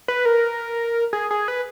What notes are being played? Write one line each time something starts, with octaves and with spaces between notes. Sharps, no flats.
B4
A#4
G#4
G#4
B4